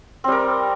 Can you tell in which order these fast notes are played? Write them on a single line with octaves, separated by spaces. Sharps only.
C4 G3 A#4